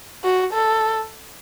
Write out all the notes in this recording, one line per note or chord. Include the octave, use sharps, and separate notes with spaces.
F#4
A4